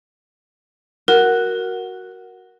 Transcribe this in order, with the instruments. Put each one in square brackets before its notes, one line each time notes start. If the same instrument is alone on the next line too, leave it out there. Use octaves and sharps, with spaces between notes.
[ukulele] F#4 [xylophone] A#4